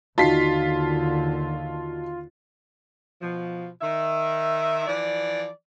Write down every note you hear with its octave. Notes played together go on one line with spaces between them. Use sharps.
D#2 D3 D#4 F4 F#4 A5 B6 C7
B2 F3
D#3 E5
E3 F3 D5